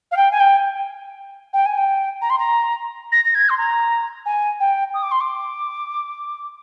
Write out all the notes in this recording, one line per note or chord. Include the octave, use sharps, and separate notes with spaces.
F5
G5
G#5
G5
G5
G#5
G5
A#5
C6
A#5
A#6
A#6
G#6
C6
A#5
G#5
G5
D#6
D6
C6
D6